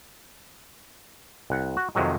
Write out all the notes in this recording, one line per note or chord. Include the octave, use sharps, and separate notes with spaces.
C2 F#5
F#4
F2 C3 D#3 F#3 G#3